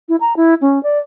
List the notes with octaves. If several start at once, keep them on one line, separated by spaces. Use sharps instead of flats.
E4
A#5
E4
C#4
D5